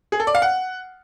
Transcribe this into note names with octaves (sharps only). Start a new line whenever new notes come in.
G#4
A4
D5
F5
F#5